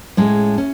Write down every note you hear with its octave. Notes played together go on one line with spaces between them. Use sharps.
A2 G#3 C#4
C#4